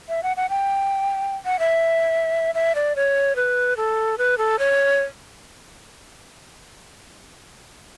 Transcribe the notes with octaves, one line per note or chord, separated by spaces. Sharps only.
E5
F#5
F#5
G5
F#5
E5
E5
D5
C#5
B4
A4
B4
A4
C#5